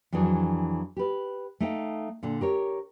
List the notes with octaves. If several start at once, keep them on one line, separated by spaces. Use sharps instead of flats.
F2 E3 F#3 D4 G#4
G4 B4
A3 D#4 F5 G5
A#2 D3 A4
G4 A#4 C#5